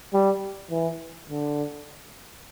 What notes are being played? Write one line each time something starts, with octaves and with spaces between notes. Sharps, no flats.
G3
E3
D3